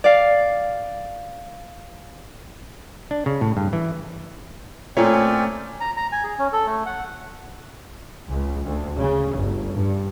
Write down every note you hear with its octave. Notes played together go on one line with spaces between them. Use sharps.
D5 F5
D4
C#3
A2
G2
E3
A#2 A3 C4 C#4 C#5 D5
A#5
A#5
G#5
G#4
C#4
A4
A3
F#5
C#2
D2
C#3
G1
G2